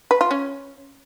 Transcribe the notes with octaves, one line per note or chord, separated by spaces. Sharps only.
B4
F4
C#4